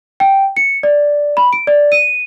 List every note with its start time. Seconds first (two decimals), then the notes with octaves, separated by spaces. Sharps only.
0.20 G5
0.57 C#7
0.83 D5
1.37 B5
1.53 D7
1.67 D5
1.92 D#7